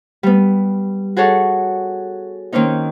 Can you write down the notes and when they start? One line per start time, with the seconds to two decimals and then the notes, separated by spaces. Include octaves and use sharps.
0.23 G3 B3
1.16 F#4 G#4 A4 C#5 F#5
2.53 D#3 A#3 C4 C#4 D#4